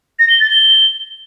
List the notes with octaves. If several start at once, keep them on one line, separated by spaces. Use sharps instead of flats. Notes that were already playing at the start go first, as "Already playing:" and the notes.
A#6
G7
A6
G7